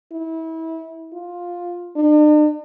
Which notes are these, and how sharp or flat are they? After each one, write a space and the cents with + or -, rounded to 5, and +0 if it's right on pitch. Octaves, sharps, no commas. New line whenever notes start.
E4 -25
F4 +10
D4 +45